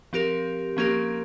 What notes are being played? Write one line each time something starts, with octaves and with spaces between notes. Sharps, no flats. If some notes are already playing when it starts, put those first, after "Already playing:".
F3 C4 G4 A#4
F3 A#3 C#4 G4 A#4